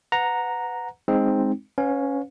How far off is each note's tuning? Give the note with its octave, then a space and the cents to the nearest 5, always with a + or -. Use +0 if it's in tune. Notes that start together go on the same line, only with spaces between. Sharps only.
B4 +20 F#5 -15 A#5 +0
G#3 +0 C4 +5 D#4 +0
C#4 +0 B4 +30 F5 +40